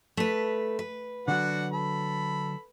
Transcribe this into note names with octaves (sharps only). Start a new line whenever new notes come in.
A3 B4
B4
D3 F#3 D4 F#4 F#5
A4 B5